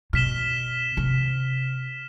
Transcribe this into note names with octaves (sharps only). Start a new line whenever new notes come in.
B2 F6 B6 E7 G7
C3